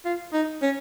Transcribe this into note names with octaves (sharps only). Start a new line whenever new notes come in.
F4
D#4
C#4